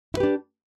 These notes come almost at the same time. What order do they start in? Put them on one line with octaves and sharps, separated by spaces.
E4 B4 G4 D4